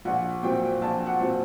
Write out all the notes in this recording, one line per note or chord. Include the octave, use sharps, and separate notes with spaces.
A#1 F#5
A#2 F#3 C4 G5
A#1 A5
F#5
A#2 F#3 C4